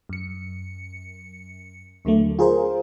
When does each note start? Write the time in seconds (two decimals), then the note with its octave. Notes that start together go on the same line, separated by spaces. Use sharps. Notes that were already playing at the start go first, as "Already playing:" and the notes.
0.09 F#2 C#7
2.05 D#2 D3 F#3 A3
2.39 F4 G#4 A#4 C5